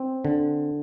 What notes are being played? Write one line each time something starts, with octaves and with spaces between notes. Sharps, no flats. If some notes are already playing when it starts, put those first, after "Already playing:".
Already playing: C4
D3